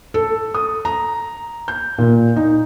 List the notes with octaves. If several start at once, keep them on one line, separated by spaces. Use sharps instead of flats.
A4
D#6
A#5
G6
A#2
D#4